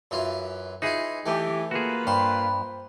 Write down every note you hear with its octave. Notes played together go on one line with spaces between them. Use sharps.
F#2 E3 F4
E3 D#4 F4 G#4
E3 A3 G4
A#3 F4 F#4 G#4 B4
G2 C5 B5